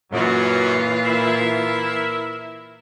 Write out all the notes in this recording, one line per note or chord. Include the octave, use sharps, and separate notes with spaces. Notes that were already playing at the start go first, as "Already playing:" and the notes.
F#2 A#2 E3 F#3 F4
E4 A#4 E5